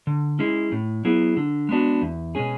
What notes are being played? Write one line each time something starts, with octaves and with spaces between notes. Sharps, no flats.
D3
G#3 C#4 E4 G#4
A2
F#3 B3 E4 G#4
D3
G#3 B3 D4 F#4
E2
B2 G#3 C#4 G#4